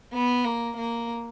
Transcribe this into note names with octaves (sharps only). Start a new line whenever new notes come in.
B3
A#3
A#3